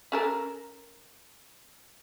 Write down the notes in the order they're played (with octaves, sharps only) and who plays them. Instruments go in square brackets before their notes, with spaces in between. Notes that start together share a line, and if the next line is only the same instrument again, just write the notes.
[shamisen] C#4 A4 A#4